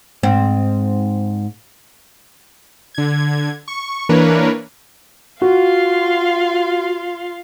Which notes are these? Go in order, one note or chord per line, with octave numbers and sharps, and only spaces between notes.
G#2 C4
D3 G#6
C#6
E3 A#3 D4 A#4 B4 C#5
F4 F#4 F5 C6